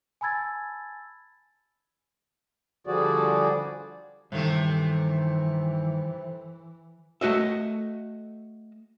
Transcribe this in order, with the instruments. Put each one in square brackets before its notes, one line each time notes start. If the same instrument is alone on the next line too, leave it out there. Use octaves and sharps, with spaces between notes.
[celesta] G#5 A5 B5 E6 G#6 A6
[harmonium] D3 F3 G3 F#4 G#4 D5
[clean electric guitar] G2 D#3 [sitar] C3 A3 [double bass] E3
[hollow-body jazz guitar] A3 F#4 D#5 E5